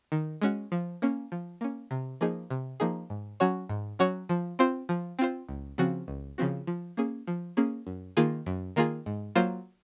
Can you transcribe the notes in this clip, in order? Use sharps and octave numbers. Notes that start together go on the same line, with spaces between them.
D#3
G#3 C#4 F#4
F3
A#3 C#4
F3
A#3 C#4
C3
F3 A#3 D#4 G#4
C3
F3 A#3 D#4 G#4
G#2
F#3 C#4 F#4 C#5
G#2
F#3 C#4 F#4 C#5
F3
C4 F4 C5
F3
C4 F4 C5
C#2
C#3 F3 C4 F#4
C#2
C#3 F3 C4 F#4
F3
A#3 C#4 G#4
F3
A#3 C#4 G#4
F#2
D#3 A#3 F4 G#4
F#2
D#3 A#3 F4 G#4
G#2
F#3 A#3 F4 C5